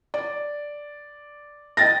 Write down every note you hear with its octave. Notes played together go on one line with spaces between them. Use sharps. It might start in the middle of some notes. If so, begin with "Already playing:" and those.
D5
D#5 G5 A6 A#6